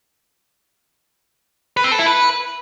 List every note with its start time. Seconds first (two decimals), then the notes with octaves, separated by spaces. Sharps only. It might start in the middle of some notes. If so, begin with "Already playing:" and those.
1.77 B4
1.84 C4
1.92 A4
1.99 E4
2.06 B4